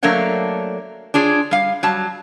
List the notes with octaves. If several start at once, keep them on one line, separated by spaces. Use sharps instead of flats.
F#3 A3 A#3 D4 C#5 F#5
D4 F4 G#4 C#5
G3 F5
F#3 G3 A5